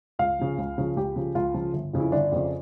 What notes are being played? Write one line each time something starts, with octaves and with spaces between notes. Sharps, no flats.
C#2 F5
C#3 F3
C#2
C#3 F3
C#2 G4
C#3 F3
C#2 F4
C#3 F3
G1
F2 C#3
E4
G1 D4
F2 C#3